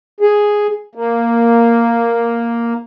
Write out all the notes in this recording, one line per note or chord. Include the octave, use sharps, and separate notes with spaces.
G#4
A#3